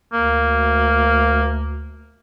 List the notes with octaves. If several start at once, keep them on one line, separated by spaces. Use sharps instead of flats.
D2 A#3